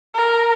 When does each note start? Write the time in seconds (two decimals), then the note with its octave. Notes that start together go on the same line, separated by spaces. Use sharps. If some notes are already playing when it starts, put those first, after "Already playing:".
0.14 A#4